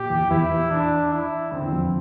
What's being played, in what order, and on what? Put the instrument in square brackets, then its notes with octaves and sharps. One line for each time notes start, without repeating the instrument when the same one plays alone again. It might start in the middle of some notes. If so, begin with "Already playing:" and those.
Already playing: [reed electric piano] A#2 [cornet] G4
[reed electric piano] E2 E3
F2 F3
[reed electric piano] E2 E3 [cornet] E4
[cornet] D4
E4
[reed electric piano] D2 D3 [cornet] C4
[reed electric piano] E2 E3
F2 F3